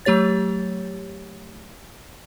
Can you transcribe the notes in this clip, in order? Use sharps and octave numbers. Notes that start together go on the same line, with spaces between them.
F#3 A3 G4 C#5 A6